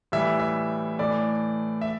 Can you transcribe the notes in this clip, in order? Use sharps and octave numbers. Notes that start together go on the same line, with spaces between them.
A2 E3 G3 E5
E5
A2 E3 A3 D5
E5